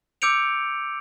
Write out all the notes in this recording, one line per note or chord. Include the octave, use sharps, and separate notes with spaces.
D6 E6 G6 C#7 D7 F7